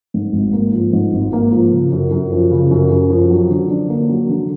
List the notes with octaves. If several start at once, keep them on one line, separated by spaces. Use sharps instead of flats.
G#2
G#1
A#3
F3
G#2
G#1
A#3
F3
C#3
F#2
F#2
F3
C#3
F#2
F#2
F3
F#3
D3
D4
A#3
F#3
D3